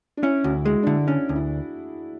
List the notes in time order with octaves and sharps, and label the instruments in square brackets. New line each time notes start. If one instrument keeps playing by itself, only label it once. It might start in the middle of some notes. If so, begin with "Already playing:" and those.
[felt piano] D4
[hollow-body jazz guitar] C#4 [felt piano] E4
[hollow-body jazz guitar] D2 [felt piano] F#4
[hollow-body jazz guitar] G#3 [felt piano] G#4
[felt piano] D4
[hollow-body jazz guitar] D3 [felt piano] E4
[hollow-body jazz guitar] C#4 [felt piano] D4
[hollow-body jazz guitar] D2
[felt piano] E4